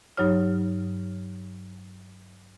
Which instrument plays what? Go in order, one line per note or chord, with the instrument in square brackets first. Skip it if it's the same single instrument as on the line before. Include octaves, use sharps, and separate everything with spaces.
[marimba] G2 F#3 D#4 C#5 F6